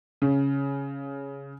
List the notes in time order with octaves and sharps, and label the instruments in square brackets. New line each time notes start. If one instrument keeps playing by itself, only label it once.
[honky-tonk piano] C#3